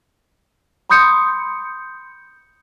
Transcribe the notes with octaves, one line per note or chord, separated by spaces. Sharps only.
B5 C6 D#6 G6 C#7